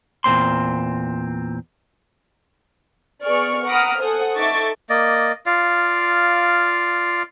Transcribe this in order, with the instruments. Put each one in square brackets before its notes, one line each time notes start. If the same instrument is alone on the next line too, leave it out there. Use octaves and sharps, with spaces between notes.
[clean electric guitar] E2 A#2 C4 C6
[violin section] B3 G#4 D5 C#6 F6
F#5 A#5 B5 D6 D#6 F6
A4 C5 F#5 G#5 D#6
D#4 A4 E5 C#6 D6 A6
[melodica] A#3 D5 D#5
F4 D5 F5